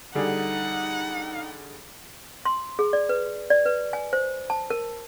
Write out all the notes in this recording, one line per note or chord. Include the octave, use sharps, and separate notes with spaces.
D3 G3 D#4 G#4 F#5
C6
G#4
D5
B4
D5
B4
G#5
C5
A5
A#4